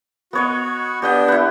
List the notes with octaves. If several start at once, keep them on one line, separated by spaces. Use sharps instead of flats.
B3 F#4 C#5 D#5
B3 D4 G4 D#5 G5
E4 B4